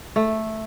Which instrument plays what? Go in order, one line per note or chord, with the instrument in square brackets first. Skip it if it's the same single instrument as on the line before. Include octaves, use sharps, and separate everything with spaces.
[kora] A3